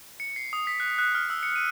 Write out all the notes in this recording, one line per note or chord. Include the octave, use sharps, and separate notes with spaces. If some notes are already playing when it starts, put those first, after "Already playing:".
C#7
C7
D#6
B6
F#6
F#6
F6
E6
C#7
D#7